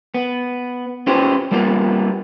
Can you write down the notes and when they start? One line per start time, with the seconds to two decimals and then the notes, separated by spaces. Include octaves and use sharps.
0.14 B3
1.07 C#4 F4 G4 B4 C5
1.51 G3 A#3 B3 F4